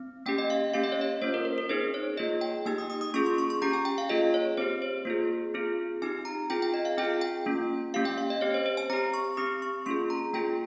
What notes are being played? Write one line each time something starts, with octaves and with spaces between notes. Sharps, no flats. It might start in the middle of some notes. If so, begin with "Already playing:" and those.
Already playing: C4
A#3 C#4 G4 G5
D#5
F5
A#3 C#4 G4 F5
D#5
C#5
D#5
A#3 C#4 F4 C5
A#4
A#4
A#4
C4 D#4 G#4 C5
C#5
A#3 F4 G#4 D#5
G5
A#3 D#4 G4 G#5
D#6
D#6
D#6
A#3 C#4 F4 G#4 C#6
C6
C#6
C#6
C#4 G4 A#5
G#5
G5
F5
A#3 F4 G#4 D#5
C#5
C4 G4 C5
C5
A#3 F4 G#4
C4 F4 G#4
C4 D#4 G4 G#5
A#5
C4 F4 G#4 G5
G5
D#5
F5
C4 F4 G#4 G5
G5
A#3 C#4 F4
A#3 C#4 G4 F5
G5
F5
D#5
C4 G4 C#5
C5
C5
G#5
C4 G4 A#5
C#6
C4 G4 D#6
C#6
A#3 C#4 F4 G#4 C6
A#5
A#3 F4 G#4 G5